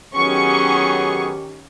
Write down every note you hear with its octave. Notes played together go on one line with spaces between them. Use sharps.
D#3 F#3 B3 C#4 G4 G#4 C#6